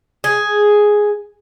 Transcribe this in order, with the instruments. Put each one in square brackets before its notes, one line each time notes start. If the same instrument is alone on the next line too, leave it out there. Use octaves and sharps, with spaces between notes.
[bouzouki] G#4